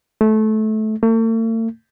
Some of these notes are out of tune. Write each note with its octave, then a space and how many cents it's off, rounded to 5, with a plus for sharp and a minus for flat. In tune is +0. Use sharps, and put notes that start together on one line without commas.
A3 -20
A3 +45